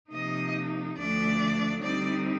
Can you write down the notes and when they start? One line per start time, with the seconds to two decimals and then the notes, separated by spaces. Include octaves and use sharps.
0.12 C3 F3 A#3 D#4 D#5
0.97 D2 D3 F3 A3 D4 D5
1.81 D3 G3 C4 D#4 D5